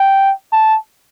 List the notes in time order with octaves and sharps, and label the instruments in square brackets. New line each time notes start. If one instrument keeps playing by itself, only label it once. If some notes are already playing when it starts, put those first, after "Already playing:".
Already playing: [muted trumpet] G5
A5